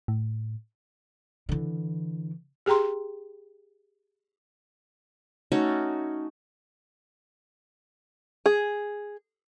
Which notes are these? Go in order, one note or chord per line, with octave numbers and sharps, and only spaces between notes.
A2
D3 E3
G4 G#4 G5 A#5 C6
A3 C#4 D#4 F#4
G#4